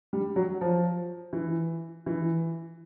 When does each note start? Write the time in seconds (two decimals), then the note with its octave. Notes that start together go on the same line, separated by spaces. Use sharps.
0.13 G3
0.36 F#3
0.61 F3
1.33 E3
2.06 E3